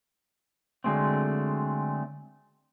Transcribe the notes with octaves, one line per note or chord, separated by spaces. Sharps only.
D3 F#3 G#3 A3 C4